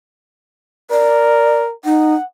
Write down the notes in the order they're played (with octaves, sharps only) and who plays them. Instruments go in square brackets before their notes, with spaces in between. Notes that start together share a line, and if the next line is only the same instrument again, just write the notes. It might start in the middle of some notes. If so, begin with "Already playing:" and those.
[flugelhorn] A#4 [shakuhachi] D5
[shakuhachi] D#4 [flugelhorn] F#5